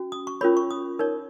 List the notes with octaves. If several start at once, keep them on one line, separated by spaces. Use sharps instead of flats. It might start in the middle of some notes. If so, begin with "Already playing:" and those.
Already playing: C#4 F#4
D#6
C#6
C#4 F4 A#4 C#5 B5
C#6
D#6
D#4 A#4 C#5